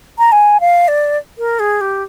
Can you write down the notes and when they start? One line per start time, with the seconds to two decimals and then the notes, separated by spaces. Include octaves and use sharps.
0.18 A#5
0.32 G#5
0.60 F5
0.88 D5
1.38 A#4
1.59 G#4
1.81 G4